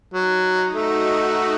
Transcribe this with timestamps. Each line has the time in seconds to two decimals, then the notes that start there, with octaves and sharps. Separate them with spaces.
0.14 F#3 D#4
0.44 D#4
0.74 A3 F#4